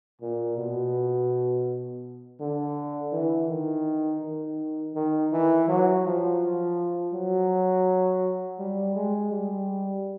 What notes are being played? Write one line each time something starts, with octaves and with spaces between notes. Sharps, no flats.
A#2
B2
D3
E3
D#3
D#3
D#3
E3
F#3
F3
F#3
G3
G#3
G3